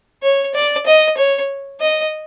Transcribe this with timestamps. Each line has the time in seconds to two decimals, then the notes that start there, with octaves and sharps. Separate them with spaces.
0.23 C#5
0.54 D5
0.86 D#5
1.18 C#5
1.81 D#5